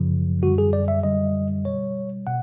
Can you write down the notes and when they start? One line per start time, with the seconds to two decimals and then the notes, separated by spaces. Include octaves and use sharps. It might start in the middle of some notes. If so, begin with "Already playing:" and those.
Already playing: F#2 C#3 F3
0.42 F#2 D3 G3 F#4
0.58 G#4
0.73 D5
0.88 E5
1.03 F#2 D3 G3 D#5
1.65 B2 G3 C#5
2.27 B2 F#5